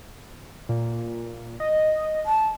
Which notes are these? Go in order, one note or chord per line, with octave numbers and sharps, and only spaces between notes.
A#2
D#5
A5